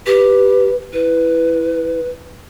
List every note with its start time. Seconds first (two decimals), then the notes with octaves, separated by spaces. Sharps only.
0.06 G4 B4
0.93 E4 B4